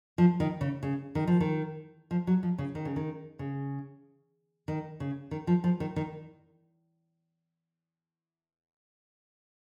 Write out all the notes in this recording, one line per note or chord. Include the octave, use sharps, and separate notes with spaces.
F3
D#3
C#3
C#3
D#3
F3
D#3
F3
F#3
F3
C#3
D#3
C#3
D#3
C#3
D#3
C#3
D#3
F3
F3
D#3
D#3